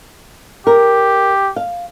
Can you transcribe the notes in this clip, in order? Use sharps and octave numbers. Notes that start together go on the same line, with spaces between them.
G4 A#4
F5